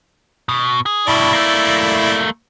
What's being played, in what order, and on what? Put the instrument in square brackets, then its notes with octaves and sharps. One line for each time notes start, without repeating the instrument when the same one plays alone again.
[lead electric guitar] B2
G#4
[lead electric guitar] G2 B2 [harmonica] E4 D5
[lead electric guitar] A3 A#3